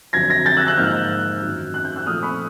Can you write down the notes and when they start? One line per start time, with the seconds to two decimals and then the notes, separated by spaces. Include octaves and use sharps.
0.13 F2 D3 F#3 G#6 A#6
0.30 G#6 A#6
0.46 G6 A6
0.57 E6 F#6
0.67 E6 F#6
0.77 G#2 F3 A#3 D#4 F6 G6
1.42 F#2 D#3 F#3
1.74 F#6
1.85 G6
1.96 E6 F#6
2.06 A#2 F3 A3 D#6 F6
2.22 B5 C#6